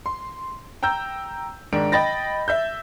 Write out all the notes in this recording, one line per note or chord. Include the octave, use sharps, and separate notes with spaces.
C6
G5 A#5 E6 G6
G#2 D#3 D4 D7
D#5 G5 B5 A6 A#6
E5 E6 G6